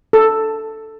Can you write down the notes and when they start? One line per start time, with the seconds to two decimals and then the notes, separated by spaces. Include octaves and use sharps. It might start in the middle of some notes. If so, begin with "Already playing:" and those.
0.13 A4